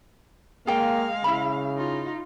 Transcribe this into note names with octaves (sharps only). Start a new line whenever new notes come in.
G#3 A#3 G#4 F5 G5
C#3 E4 B5
D#4 F4